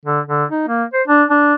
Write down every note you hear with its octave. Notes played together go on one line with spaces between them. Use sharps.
D3
D3
D#4
A#3
C5
D4
D4